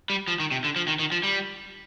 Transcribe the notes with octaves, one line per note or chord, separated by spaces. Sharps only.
G3
F3
D#3
C3
D3
F3
D#3
D#3
F3
G3